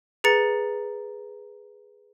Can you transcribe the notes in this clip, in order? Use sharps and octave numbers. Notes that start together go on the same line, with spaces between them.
G#4 B4 A#5 A6 C#7